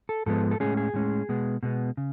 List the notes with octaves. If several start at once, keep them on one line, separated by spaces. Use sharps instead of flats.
A4
G#2 F3 G#3 B3 A4
A4
A2 G#3 C#4 G#4
G#4
A2 G#3 C#4
B2 G#3 B3
B2 G#3 B3
C#3